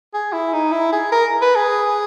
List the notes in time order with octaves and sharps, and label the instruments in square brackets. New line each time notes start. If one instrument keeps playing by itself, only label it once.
[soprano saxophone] G#4
E4
D#4
E4
G#4
A#4
B4
G#4